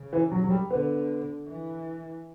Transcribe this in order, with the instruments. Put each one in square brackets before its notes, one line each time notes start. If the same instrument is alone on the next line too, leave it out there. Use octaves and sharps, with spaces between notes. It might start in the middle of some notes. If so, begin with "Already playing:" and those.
Already playing: [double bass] C#3
[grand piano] E3
F#3
F#3
G3
[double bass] D3 [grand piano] B3
[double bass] E3